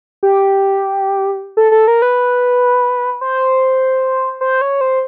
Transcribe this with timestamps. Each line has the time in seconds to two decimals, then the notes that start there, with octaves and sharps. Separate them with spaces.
0.23 G4
1.57 A4
1.72 A4
1.88 A#4
2.02 B4
3.21 C5
4.41 C5
4.61 C#5
4.81 C5